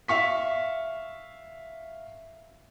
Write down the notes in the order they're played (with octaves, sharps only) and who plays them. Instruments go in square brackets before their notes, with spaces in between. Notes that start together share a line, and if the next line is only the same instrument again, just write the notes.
[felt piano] E5 F5 C#6 B6